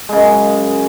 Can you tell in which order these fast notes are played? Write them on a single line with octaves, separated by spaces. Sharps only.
G#3 C#3 F#2